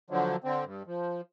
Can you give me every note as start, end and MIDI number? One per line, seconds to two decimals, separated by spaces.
0.10 0.36 50
0.10 0.36 53
0.10 0.36 54
0.44 0.65 50
0.44 0.65 60
0.65 0.83 43
0.87 1.21 53